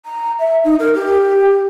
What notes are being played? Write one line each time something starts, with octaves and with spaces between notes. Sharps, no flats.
A#5
E5
D#4
A#4
G4